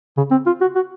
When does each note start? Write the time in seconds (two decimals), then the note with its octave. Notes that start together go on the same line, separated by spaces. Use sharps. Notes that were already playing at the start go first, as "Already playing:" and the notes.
0.17 C#3
0.31 C4
0.46 F4
0.61 F#4
0.75 F#4